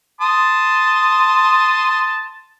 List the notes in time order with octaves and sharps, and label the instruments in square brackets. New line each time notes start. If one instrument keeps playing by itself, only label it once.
[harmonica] A5 C6 D#6